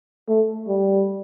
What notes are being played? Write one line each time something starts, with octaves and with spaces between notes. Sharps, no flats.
A3
G3